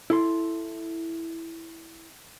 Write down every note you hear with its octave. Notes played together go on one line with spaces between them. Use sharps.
E4 A4 C6